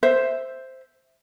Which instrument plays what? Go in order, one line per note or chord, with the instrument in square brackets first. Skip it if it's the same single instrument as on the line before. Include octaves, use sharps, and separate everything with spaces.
[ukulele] C5 E5